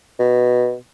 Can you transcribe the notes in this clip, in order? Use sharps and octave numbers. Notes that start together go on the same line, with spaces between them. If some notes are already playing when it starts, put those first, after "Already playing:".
B2